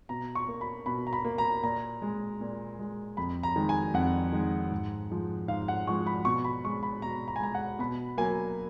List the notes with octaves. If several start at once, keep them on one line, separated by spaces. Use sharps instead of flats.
B2 A#5
C#6
A#3
B5
B2 B5
A#5
B5
A#3
A#5
A#2 A#5
G#3
A#2
G#3
F2 B5
A#5
D#3 G#3
G#5
F2 F#5
D#3 G#3
G#2
F3 G#3
G#2 F5
F#5
F3 G#3 C#6
B5
B2 C#6
B5
G#3 C#6
B5
B2 A#5
A#5
G#5
G#3 A#5
F#5
B2 B5
F#3 A#3 G#5